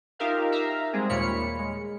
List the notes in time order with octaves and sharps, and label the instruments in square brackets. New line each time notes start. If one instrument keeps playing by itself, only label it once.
[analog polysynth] D#4 F4 G4 A#4 E5 F5
E5 F5 A#5
G3 G#3 C4 G#4
D#2 A#2 C#5 F5 B5 C#7
G#3